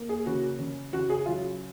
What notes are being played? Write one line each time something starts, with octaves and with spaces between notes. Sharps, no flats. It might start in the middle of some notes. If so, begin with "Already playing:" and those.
Already playing: A#3
G#4
C#3 F#4
C#3
C#3 F#4
G#4
F#3 F4